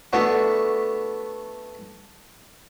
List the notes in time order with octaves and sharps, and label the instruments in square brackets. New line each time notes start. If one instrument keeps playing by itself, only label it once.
[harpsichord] A3 B3 D4 F#4